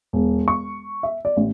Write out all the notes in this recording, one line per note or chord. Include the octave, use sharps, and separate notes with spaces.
E1
C#6
E5
D5
A1